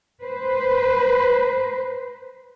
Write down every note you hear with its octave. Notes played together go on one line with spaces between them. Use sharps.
B4 C5